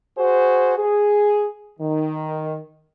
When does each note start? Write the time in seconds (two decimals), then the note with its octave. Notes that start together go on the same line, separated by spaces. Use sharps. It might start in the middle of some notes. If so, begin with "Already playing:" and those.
0.18 F#4 G#4 C5
0.78 G#4
1.80 D#3